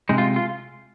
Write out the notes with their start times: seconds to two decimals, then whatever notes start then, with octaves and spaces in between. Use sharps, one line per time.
0.09 C3 G#3 D#4
0.18 F4
0.36 F4